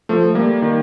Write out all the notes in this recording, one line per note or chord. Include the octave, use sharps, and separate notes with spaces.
F3 A3
G3 A#3
D#3